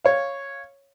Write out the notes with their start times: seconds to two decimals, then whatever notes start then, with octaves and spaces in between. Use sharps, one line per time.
0.05 C#5 F5